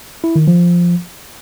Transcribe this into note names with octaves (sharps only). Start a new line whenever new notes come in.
E4
D#3
F3